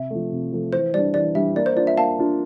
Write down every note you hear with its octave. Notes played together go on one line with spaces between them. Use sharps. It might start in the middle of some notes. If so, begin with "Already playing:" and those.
Already playing: C3 E5
F3 A3
C3
F3 A3
E3 C5
G3 D4 D5
E3 D5
G3 D4 E5
A#3 D5
C5
D4 F4 D5
E5
A#3 F5 A5
D4 F4